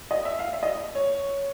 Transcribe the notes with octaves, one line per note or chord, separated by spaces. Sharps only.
D#5
E5
F5
E5
D#5
C#5